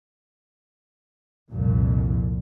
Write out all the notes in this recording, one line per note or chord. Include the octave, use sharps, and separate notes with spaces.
C2 F2 A#2